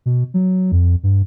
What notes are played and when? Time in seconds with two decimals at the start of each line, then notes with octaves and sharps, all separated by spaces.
0.06 B2
0.34 F#3
0.72 F2
1.03 G2